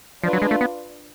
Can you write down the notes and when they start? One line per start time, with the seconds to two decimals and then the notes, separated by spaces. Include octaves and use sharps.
0.23 F3 D4 F4 B4
0.33 F#3
0.42 G#3
0.51 A3
0.61 B3